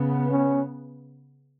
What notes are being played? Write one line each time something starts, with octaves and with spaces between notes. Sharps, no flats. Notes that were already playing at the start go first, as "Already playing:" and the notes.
Already playing: C#3 B3
C#4